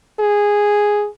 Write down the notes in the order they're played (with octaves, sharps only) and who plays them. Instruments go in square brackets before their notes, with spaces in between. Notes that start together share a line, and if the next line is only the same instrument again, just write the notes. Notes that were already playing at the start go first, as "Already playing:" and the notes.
[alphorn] G#4